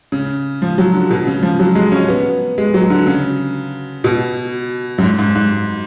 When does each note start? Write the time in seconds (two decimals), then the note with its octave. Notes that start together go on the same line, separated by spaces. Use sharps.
0.12 C#3
0.62 F3
0.78 F#3
0.93 D3
1.11 B2
1.27 C#3
1.43 F3
1.60 F#3
1.75 G#3
1.92 C#4
2.09 B3
2.58 G#3
2.74 F#3
2.90 D3
3.07 C#3
4.04 B2
4.98 F#2
5.03 G#2
5.19 G#2
5.35 G#2